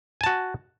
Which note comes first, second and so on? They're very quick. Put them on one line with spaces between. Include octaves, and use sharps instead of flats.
G#5 A5 F#4